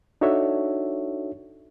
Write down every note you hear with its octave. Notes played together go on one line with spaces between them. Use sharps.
D4 D#4 F#4 A4 C#5 E5